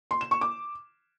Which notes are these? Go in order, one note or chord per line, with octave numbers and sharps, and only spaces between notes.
C6
E7
C#6
D6